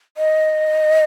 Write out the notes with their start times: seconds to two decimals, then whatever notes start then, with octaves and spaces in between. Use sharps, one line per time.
0.17 D#5